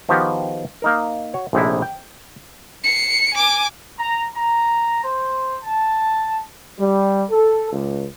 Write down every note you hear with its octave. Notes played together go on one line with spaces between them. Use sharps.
D#3 F3 B3 F#4 G4
A#3 D#4 A#4
F#4 C#5
A#1 A2 C3 D#4 E4
G5
C7 C#7
G#5 D6
A#5
A#5
C5
A5
G3
A4
C#2